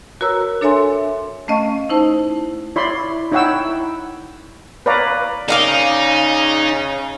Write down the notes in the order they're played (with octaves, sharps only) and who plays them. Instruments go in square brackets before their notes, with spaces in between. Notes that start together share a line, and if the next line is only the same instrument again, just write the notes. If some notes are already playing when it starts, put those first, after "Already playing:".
[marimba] F#4 A#4 B4 C#5 A#5 E6
D4 A4 C#5 E5 G#5 C6
A3 C#4 D#5 F5 C#6
D#4 E4 C5 A5
[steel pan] E4 C#5 D5 B5 C6
D#4 E4 C#5 F#5 G5 E6
B4 C#5 D5 F5 A#5
[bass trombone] C#3 [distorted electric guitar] D#4 [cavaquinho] D5 F5 D6